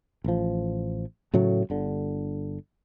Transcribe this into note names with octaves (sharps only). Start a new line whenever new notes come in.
A1 F3
A2 C#3 F#3 A3
G1 D3